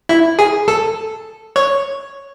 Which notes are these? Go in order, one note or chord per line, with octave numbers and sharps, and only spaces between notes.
E4
G#4
A4
C#5